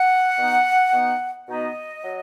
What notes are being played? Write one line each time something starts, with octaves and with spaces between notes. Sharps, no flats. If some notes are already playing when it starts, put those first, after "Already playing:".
Already playing: F#5
B2 B3 D#4
B2 B3 D#4
B2 B3 D#4 D#5
F#3